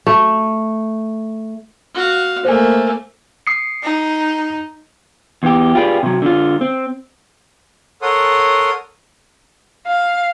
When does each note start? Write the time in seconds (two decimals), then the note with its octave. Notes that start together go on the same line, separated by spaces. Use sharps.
0.07 A3
1.94 F#4 F5
2.45 A3 A#3 C5 G#5
3.47 D#6 C7 C#7
3.83 D#4
5.43 E2 E3 G4
5.75 F4 G4 G#4 B4 C5 D5
6.03 C3 F#3
6.22 D3 F4
6.61 C4
8.02 A4 A#4 C#5 F#5 C6 D#6
9.87 F5